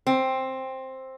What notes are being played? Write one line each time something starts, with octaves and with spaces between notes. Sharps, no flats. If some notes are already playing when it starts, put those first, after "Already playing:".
C4